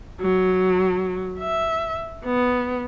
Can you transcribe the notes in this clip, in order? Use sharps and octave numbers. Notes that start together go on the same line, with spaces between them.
F#3
E5
B3